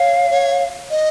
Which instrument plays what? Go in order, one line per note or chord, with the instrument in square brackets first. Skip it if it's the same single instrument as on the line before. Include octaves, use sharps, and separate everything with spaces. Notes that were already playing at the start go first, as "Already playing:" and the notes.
Already playing: [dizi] C#5 [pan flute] F5
[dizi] C#5
D#5